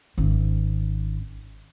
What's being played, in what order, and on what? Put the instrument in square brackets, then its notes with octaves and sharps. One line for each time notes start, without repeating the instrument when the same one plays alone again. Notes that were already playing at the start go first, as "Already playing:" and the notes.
[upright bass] G#1 C#4